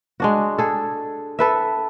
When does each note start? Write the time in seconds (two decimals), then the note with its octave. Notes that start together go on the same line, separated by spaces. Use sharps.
0.20 G#3 D4 F#4
0.58 G#4 A4
1.39 A4 B4 E5